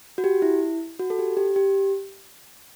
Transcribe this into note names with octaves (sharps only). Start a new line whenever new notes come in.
F#4
G4
E4
F#4
A4
G4
G4
G4